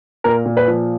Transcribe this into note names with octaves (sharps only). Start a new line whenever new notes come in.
A#2 A#4
A#2
B4
F3